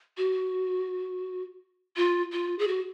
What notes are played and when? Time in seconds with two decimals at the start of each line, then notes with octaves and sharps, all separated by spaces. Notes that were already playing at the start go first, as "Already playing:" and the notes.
0.17 F#4
1.96 F4
2.32 F4
2.59 G#4
2.68 F#4